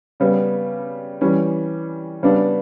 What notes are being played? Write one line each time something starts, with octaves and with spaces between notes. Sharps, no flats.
C#3 G3 B3
E3 G3 C#4
C#3 G3 B3 D4